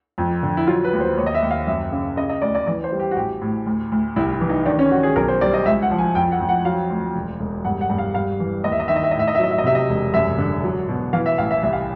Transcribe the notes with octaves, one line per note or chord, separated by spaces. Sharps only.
F2
D3
E4
F#3 F4
B4
D#2
C5
D#2 C#5
D#5
E5
D#2
F5
F#2 E5
C#3
C#3 D#5
D#5
D2 D5
D5
E3 D5
C5
G3
G4
F#4
A1 G4
A2
D2
D2
C2 E4
E4
E3
D#4
D#3 D4
C#4
D#3 F#4
G#4
B1 A#4
C5
G3 D5
D#5
C#2 E5
F#5
F3
G#5
F2 G5
F#5
F2
F#5
F#3 F5
D2
E1
E1
G2 F#5
F#5
G2
F5
G2 F5
E3
D#2 D#5
E5
D#5
D#3 E5
D#5
E5
D#5
A2
E5
D#5
E5
F#3 D#5
E5
D#5
C3 E5
D#5
E1
F#2 E5
D3
F#3
B2
E3 F5
E5
A1 F5
E5
C2 E5
F5